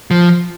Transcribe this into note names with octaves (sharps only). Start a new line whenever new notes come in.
F3